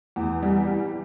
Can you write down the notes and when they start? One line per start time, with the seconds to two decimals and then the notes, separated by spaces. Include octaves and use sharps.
0.16 E2
0.43 G3
0.69 E3